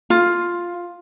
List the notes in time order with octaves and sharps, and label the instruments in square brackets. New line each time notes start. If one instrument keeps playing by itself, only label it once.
[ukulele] F4